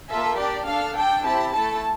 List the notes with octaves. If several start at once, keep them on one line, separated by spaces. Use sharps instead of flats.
A#3 F4 A4 E5
D4 G4 D5
D4 A4 F5
D4 A4 G5
C4 E4 G4 A5
A3 E4 A4 A5